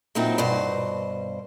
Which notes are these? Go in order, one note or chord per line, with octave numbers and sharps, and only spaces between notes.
A#2 F#3 C4 D#4 E4
G2 B2 C5